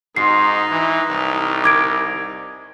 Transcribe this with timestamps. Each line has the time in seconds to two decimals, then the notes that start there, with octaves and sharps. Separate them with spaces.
0.16 G#2 C4 D#4 F4 F#4 C7
0.71 E3
1.10 C2
1.64 A#4 D6 G#6 D7